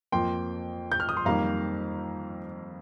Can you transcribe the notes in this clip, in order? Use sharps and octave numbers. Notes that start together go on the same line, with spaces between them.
F2 F3 A#3 G5 C6
G6
F6
D#6
C6
F2 D#3 G3 A#3 F5 A#5